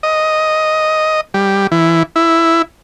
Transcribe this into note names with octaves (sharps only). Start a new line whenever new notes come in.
D#5
G3
E3
E4